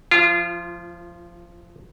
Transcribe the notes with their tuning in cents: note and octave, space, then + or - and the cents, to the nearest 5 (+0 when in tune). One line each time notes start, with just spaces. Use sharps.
F3 +0 F4 -30